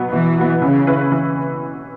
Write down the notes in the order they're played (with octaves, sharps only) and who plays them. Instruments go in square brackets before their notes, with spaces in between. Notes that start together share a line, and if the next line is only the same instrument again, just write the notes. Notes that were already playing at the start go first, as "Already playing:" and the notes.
Already playing: [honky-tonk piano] B2 F#3 B3
[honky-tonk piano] B2 [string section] E3
[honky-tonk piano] F#3 B3
[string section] C#3 [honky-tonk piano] E3
[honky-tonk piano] C#4 E4 B4
E3